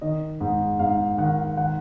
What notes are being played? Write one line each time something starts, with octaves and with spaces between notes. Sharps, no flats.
D#3 D#5
G#2
G#2 F5
D#3 F#5
D#3 F#5